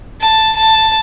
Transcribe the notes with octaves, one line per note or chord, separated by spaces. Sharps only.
A5
A5